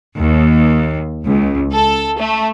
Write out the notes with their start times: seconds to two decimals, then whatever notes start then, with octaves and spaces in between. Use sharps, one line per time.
0.18 D#2
1.25 C#2
1.72 A4
2.18 A3